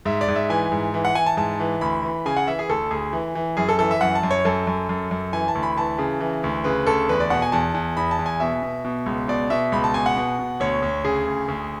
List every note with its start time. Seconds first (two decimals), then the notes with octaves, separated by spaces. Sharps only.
0.05 G#2 E5
0.21 D5
0.28 G#2
0.36 E5
0.49 E3 G#5
0.72 G#2
0.94 E3
1.05 F#5
1.15 E3 G#5
1.26 A5
1.37 G#2 A5
1.60 E3
1.81 D2 B5
2.03 E3
2.26 C#3 G#5
2.37 F#5
2.48 E3 E5
2.59 G#4
2.69 D2 A4
2.91 D2 G#4
3.13 E3
3.35 E3
3.57 F#2 G#4
3.69 A4
3.79 E3 A4
3.91 E5
4.01 F#2 F#5
4.15 A5
4.23 F#2
4.31 C#5
4.45 F#2 A4
4.67 F#2
4.89 F#2
5.11 F#2
5.33 E3 G#5
5.48 A5
5.55 D2
5.63 B5
5.77 E3 A5
5.99 C#3
6.20 E3
6.44 D2
6.64 C#3 B4
6.87 D2 A4
7.09 E2 B4
7.20 D5
7.30 B2 F#5
7.42 G#5
7.52 E2 A5
7.74 E2
7.97 E2 B5
8.11 A5
8.19 E2
8.26 G#5
8.40 B2 E5
8.63 B2
8.85 B2
9.06 C#2
9.28 B2 D5
9.50 B2 E5
9.72 C#2 B5
9.84 A5
9.94 B2 G#5
10.06 F#5
10.17 B2
10.39 B2
10.60 D2 C#5
10.82 D2
11.05 C#3 G#4
11.27 D2
11.48 D2